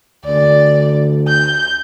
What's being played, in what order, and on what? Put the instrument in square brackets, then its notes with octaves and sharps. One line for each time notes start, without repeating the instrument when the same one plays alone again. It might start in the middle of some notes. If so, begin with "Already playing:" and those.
[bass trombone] D2 [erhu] D5
[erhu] G6